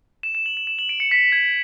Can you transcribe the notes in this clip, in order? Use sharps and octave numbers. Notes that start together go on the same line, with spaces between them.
E7
E7
F#7
E7
E7
F#7
D7
C#7
B6
G#6